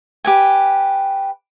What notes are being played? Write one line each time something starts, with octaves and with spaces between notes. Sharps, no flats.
G4 B4 G#5